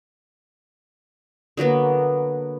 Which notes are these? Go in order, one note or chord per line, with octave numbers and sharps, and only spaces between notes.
D3 F#3 A#3 B3